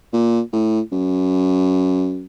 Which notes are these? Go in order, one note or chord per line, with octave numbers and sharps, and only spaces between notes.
A#2
A2
F#2